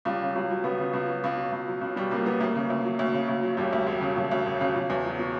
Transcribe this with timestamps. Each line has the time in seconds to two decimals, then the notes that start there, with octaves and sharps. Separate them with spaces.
0.05 C#2 G3
0.21 C#3
0.35 C#2 F#3
0.50 F#3
0.64 C#2 B3
0.79 C#3
0.93 C#2
1.08 F#3
1.24 C#2
1.37 B2
1.52 C#2
1.68 F#3
1.81 C#2
1.96 B2 G3
2.11 C#2 A#3
2.25 F#3 B3
2.40 D2 A#3
2.55 C#3
2.70 D2
2.85 F#3
2.99 D2
3.14 C#3
3.28 D2
3.43 F#3
3.57 E1 G3
3.73 D2
3.87 E1
4.01 C#3
4.16 E1 F#3
4.31 D2
4.46 E1
4.61 C#3
4.75 E1 F#3
4.90 E2
5.05 F#3
5.19 B2